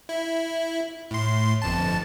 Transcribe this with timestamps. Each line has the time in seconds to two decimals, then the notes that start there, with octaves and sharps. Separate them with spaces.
0.09 E4
1.11 A2 C6
1.62 G1 F2 A5